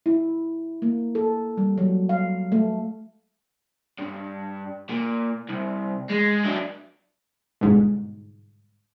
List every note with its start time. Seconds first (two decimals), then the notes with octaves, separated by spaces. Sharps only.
0.06 E4
0.82 A#3
1.15 A4
1.57 G3
1.78 F#3
2.09 F5
2.52 A3
3.99 G2
4.90 A#2
5.49 C2
6.09 G#3
6.44 F#3 D4
7.61 G1 G#2 B2